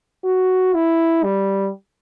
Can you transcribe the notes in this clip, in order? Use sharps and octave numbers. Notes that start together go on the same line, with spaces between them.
F#4
E4
G3